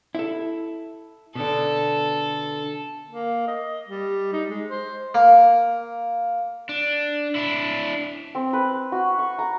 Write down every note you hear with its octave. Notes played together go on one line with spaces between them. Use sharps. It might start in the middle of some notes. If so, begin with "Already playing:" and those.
E4 A4
B2 D3 A4
A#3
D#5
G3
D#4
G#3
C5
A#3
D4
D4 E4
C4
B4
F#4
C#6
A#5